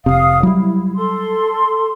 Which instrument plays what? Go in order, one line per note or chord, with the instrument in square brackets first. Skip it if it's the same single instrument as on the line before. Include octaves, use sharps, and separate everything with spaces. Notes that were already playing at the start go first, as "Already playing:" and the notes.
[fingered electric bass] F1 C3 [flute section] F5 D#6
[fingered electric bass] F#3 G3 [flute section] E4
[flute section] A4 C6